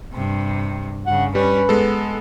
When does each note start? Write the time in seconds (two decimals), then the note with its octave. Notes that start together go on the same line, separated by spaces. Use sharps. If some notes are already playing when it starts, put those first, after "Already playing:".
0.13 G2 C3
1.07 G2 C#3 F#5
1.35 G3 C#4 B4
1.69 G#3 B3 A4